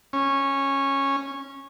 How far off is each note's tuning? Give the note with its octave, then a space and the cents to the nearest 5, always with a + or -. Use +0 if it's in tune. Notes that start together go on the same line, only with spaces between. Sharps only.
C#4 -10